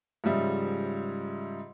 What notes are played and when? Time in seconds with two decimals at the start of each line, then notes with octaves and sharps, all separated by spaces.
0.24 G#2 C#3 F3 G3 E5